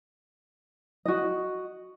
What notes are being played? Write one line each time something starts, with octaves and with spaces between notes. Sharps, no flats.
F#4 D#5